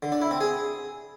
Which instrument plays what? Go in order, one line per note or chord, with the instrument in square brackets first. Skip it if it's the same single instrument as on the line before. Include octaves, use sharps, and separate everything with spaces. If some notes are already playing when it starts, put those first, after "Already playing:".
[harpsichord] D3
D4
E4
C4
G#4